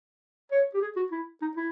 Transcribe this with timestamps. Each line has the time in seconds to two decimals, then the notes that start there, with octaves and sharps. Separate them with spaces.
0.52 C#5
0.74 G4
0.81 G#4
0.96 F#4
1.12 E4
1.42 D#4
1.57 E4